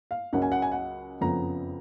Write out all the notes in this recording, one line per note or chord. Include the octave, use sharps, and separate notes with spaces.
F5
C#2 C#3 F#3 A#3 C#4 F#5
G#5
F#5
G#5
F#5
F#1 F2 C#3 F3 B3 A#5